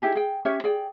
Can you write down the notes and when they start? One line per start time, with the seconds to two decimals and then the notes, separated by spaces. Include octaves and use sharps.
0.02 D#4 E4 G4 G#4
0.15 G#4 G5
0.45 C#4 G4 C#5 E5
0.64 G#4 D5 G5